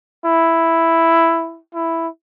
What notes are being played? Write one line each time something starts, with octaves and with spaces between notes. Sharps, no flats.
E4
E4